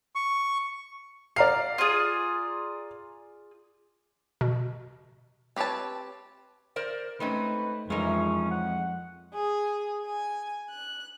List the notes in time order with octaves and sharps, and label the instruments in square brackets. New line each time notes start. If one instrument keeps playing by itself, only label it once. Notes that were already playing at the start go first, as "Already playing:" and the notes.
[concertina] C#6
[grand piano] D5 A#5 C7 [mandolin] F5
[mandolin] F4 G#4
[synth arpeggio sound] B2
[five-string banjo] C4 G4 B4 C#5 A5
[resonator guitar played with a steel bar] A#4 C5 D5
[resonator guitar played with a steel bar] G#3 C4 C#4 [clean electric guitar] A3 D#4 [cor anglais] B4
[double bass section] F2 [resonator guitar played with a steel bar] E3 F4 [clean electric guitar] G#3 D#4 A#4 [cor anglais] C#4
[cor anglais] F#5
[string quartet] G#4
G#5
F#6